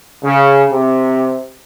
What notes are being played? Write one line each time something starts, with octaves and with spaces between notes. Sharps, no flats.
C#3
C3